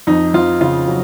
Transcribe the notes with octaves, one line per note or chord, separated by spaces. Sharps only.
F2 D#4
F2 F4
C#3 F4
F#3